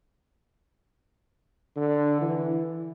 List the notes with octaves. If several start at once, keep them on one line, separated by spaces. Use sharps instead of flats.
D3
E3